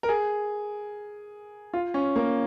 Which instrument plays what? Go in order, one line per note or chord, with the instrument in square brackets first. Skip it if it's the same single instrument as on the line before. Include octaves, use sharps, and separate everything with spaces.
[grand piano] A#4
G#4
F4
C#4
A#3